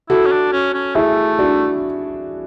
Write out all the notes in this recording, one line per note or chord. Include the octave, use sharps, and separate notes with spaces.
E4 F#4 A4
C#4
D4
C#4
C#4
A3 E4 G#4
D4 F#4